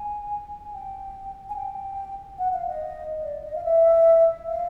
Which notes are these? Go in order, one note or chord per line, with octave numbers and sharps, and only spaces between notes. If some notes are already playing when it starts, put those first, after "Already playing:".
Already playing: G#5
G#5
G5
G#5
G5
F#5
F5
D#5
D5
D#5
F5
E5
F5